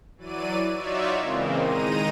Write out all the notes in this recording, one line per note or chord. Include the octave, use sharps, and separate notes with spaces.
E3 F#3 D5 D#7
D#4 F4 F#4 C#5 D5 E5
A#2 C#3 E3 G#3 A#3 C4
D#3 G#3 D#4 A#5 D#7